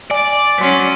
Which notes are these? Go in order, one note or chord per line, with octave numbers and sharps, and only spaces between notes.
D5 G#5 D7
F#3 C#4 C6 B6